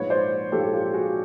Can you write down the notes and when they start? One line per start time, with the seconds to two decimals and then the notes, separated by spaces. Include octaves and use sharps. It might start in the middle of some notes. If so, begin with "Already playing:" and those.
Already playing: A#1 G#2 F3 B4 C#5
0.10 C5 D5
0.51 A#1 G#2 F3 G4 A4
0.73 F4 G4
0.93 F#4 G#4